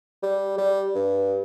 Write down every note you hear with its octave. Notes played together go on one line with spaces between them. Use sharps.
G3
G3
G2